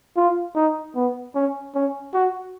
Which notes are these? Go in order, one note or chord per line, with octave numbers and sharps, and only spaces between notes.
F4
D#4
B3
C#4
C#4
F#4